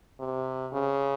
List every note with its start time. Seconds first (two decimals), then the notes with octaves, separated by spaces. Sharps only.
0.20 C3
0.73 C#3